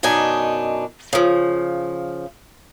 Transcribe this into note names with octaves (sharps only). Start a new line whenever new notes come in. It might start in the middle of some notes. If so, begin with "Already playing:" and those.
F#2 B2 D4 D#4 G#5
C#3 F3